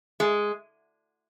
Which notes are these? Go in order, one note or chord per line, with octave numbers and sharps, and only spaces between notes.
G#3